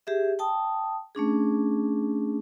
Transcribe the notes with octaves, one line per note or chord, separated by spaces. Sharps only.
G4 G#4 E5
G5 A5 D#6
A3 C#4 D4 G#4